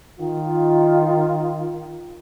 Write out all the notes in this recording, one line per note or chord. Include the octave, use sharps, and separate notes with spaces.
D#3 F4